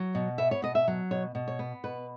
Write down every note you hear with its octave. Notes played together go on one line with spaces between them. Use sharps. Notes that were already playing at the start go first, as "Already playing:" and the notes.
Already playing: F#3
B2
B3 E5
C#5
B2 D#5
E5
F#3
B2 C#5
B2
C#5
B3
B2 B4